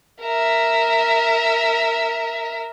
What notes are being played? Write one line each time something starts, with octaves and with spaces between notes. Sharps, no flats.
A#4 E5